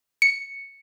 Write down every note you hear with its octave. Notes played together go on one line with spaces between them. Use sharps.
C#7